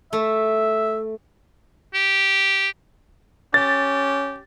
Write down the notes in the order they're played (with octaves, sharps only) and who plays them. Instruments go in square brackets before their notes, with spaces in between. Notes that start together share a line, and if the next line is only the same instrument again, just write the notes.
[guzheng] A3 [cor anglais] E5
[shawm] G4
[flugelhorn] C#4 [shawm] G4 [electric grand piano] A6